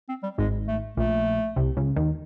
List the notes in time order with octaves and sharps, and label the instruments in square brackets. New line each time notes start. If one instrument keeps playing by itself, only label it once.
[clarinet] C4
G3
[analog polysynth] G#1 G#2 [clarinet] G#3
[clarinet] A3
[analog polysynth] A#1 A#2 [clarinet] A3
[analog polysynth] C2 C3
C#2 C#3
D#2 D#3